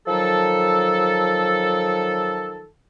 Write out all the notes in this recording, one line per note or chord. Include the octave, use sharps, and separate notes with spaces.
D#3 F3 F#3 A4